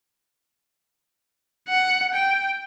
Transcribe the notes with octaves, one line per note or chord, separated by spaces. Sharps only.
F#5
G5